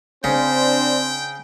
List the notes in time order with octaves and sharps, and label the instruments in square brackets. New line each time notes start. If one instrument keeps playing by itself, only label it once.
[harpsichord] C#3 [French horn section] C4 D4 [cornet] C5 [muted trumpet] G5